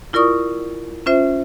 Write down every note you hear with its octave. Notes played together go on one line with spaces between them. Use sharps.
E4 F4 A#4 D5 C#6 D#6
C#4 F4 C5 E5